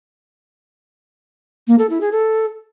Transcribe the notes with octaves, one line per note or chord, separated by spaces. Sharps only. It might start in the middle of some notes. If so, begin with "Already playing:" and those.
A#3
A4
E4
G#4
A4